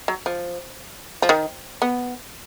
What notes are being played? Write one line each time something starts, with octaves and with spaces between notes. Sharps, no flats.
F#3
F3
F3
D#3
B3